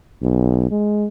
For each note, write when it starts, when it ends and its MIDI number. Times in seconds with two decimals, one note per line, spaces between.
0.23 0.67 35
0.71 1.07 56